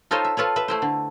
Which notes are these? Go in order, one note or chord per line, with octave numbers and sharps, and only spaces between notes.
D#4 F4 A4 C5 C#5 D#5
E5
F4 A4 B4 C#5
B4 E5
A3 E4 C5
D3